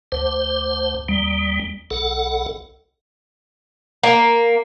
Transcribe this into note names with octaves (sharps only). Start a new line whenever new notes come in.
D2 C5
D#2 G3
B1 A4 F#5
A#3